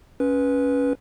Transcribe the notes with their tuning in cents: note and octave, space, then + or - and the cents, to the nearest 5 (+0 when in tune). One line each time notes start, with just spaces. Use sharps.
C#4 +5 B4 -10